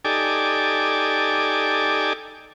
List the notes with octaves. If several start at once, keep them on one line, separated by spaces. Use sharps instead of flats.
D#4 G4 A4 D5 G#5 D6